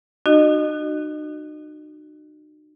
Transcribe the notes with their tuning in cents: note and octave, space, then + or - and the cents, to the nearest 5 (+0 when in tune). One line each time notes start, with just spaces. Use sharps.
D#4 -45 F#4 +0 D#5 -25